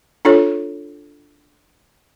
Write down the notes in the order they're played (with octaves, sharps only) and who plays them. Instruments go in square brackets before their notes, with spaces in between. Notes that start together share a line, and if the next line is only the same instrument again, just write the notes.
[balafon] D4 F4 A4 C#5